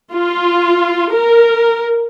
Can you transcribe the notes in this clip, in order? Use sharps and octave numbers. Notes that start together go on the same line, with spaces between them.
F4
A#4